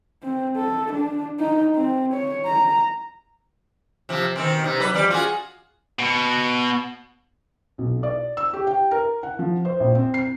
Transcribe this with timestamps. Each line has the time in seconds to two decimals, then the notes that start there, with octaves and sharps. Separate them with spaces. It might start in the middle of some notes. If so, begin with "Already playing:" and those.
0.23 C4
0.57 A4
0.93 D4
1.40 D#4
1.75 C4
2.13 C#5
2.46 A#5
4.09 C3 F3
4.36 B2 D#3 C4
4.64 C3 D#4
4.80 F#3 B4
4.94 F2 G3 D5
5.10 F4 F#4 G#4
5.99 B2
7.78 B1
8.03 D5
8.37 E6
8.53 G4
8.67 G5
8.91 A#4
9.23 F#5
9.39 F3
9.65 C5
9.80 A#1
9.95 C4
10.14 C7